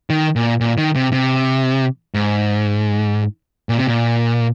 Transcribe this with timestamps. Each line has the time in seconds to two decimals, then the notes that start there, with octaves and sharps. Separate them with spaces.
0.10 D#3
0.36 A#2
0.61 A#2
0.78 D#3
0.95 C3
1.12 C3
2.14 G#2
3.69 A#2
3.78 C3
3.87 A#2